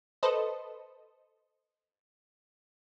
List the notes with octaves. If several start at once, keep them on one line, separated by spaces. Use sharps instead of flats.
A4 B4 C5 D#5